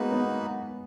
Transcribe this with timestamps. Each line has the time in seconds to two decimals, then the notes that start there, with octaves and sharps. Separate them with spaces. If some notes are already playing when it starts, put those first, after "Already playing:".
Already playing: G#3 A#3 B3 D#4 F#4 B4
0.11 G#3 B3